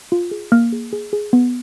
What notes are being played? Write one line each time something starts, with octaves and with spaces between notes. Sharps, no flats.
F4
G#4
A#3 F6
G#4
G#4
G#4
B3